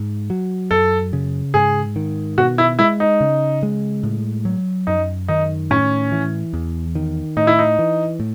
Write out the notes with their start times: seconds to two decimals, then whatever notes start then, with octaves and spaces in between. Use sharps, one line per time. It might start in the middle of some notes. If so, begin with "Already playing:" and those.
Already playing: G#2
0.30 F#3
0.71 F#2 A4
1.13 C#3
1.54 G#2 G#4
1.96 D#3
2.38 B2 F#4
2.58 E4
2.79 G#3 E4
3.00 D#4
3.21 C#3
3.63 G#3
4.03 A2
4.45 F#3
4.87 F#2 D#4
5.28 D#3 D#4
5.70 A2 C#4
6.12 E3
6.54 E2
6.95 D#3
7.37 A2 D#4
7.47 E4
7.59 D#4
7.79 E3
8.20 A2